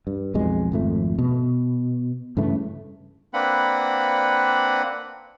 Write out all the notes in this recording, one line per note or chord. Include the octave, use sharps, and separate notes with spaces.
G2
B1 F2 G#3
G#1 F2 A3
B2
G2 C#3 E3 A3
A#3 C4 D4 B4 F#5 B5